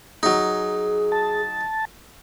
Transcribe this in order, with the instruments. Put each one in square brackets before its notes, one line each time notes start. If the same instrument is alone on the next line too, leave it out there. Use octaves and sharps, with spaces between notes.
[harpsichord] F#3 D#4 [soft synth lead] G#4
[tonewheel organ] A5